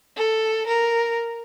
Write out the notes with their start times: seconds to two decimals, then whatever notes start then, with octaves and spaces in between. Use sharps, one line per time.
0.17 A4
0.67 A#4